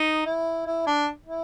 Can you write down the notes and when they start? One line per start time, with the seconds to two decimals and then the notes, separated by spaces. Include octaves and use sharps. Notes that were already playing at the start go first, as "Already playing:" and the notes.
Already playing: D#4
0.26 E4
0.66 E4
0.86 D4
1.26 E4